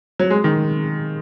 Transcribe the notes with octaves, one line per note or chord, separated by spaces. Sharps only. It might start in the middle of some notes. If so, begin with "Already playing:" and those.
F#3
G#3
D#3